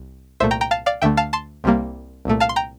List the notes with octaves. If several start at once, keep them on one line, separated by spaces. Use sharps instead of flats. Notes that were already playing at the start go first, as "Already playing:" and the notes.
Already playing: C2
C2 A#2 A3 C5 E5
G5 A#5
G5 A#5
F5 A5
D5 F5
D2 D3 A3 E5 G5
F5 A5
A5 C6
C2 C3 G3 A#3
C2 A#2 A3
F5 A5
C6
G5 A#5